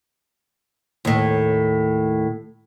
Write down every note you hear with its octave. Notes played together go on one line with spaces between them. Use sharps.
D#2 A2